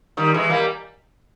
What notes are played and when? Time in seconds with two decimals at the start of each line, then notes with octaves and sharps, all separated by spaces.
0.17 D#3 G3
0.34 E3 G#3
0.49 G3 A#3